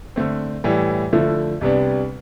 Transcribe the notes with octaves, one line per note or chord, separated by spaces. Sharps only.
D3 A3 C4
A2 E3 G3
D3 F3 A3 E4
C2 C3 G3 B3 D4